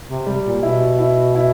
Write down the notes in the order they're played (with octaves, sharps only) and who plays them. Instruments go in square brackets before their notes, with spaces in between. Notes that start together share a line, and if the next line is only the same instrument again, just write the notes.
[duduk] C3
[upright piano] G3
[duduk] A#2
[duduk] B2 [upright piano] E4
[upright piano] E4
E4